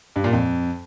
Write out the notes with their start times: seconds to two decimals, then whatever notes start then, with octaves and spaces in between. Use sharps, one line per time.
0.16 G2
0.24 A#2
0.33 F2